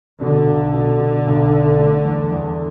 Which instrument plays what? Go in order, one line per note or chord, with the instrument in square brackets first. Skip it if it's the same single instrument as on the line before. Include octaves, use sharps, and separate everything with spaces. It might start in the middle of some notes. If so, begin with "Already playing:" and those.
[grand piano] B2 [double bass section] D3
[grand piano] B1
B2
B2
B1
B1
A3
E2
E2